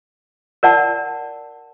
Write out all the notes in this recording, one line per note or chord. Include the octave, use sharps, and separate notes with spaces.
A#4 D5 F#5 A5